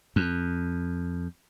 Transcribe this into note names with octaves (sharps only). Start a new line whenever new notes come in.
F2